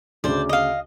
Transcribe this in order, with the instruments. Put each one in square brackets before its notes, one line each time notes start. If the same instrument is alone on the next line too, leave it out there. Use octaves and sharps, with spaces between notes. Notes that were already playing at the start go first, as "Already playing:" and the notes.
[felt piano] D2 C#3 [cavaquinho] C5 D5
[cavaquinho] D#5 F5